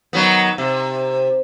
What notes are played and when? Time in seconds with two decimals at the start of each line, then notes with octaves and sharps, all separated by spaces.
0.13 D#3 F#3 B3
0.58 C3